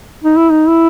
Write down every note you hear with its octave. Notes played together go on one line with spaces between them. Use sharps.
D#4
E4
D#4
E4